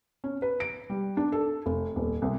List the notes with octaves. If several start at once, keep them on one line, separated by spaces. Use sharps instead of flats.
C#4
B4
D7
G3
D4
A4
F1
D#1
C2